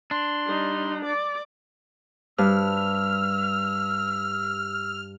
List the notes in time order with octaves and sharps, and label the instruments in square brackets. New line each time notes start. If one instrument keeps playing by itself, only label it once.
[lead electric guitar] D4 [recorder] C6
[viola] G3 D#4
D5 D6
[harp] G2 [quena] E6 [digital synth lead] F6